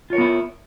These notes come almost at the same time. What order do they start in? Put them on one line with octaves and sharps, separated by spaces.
F4 C#5 A#4 B3 E4